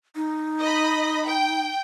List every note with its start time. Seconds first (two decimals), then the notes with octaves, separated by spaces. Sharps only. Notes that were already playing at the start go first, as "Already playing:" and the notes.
0.15 D#4
0.60 D#5 B5
1.26 G5